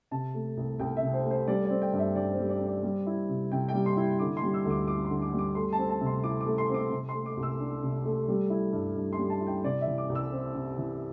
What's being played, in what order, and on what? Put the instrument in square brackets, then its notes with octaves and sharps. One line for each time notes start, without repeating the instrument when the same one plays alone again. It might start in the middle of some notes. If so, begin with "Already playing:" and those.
[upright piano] C3 A5
A3
C2
C2 G5
E5
C3
C5
A3
C5
G3 D5
D5
C4
G5
G2
E5
G2 D5
C5
G3
D5
C4
D5
G3
E4
C3
C3 G5
G5
G3
C6
E4
D3 D6
C6
G3
E6
D2
D6
E4 D6
D3 C6
D6
G3
D6
A3 C6
A5
C4
A5
C3
C6
E4 D6
D6
A3
C6
C4 D6
C3
C6
A3
D6
C2
E6
D4
C3
A3
G3
E4
G2
G2
C6
G3
A5
E4
G5
C3 D5
E5
E3
D6
C2
E6
C4
C3
E3